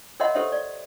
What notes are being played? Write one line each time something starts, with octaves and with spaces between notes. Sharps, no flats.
A#4 C#5 D#5 E5 F#5 C6
G4 A4 C5 C#5 E5 F#5
D5